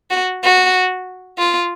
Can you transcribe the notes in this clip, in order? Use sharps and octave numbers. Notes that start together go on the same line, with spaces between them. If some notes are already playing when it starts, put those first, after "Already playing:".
F#4
F#4
F4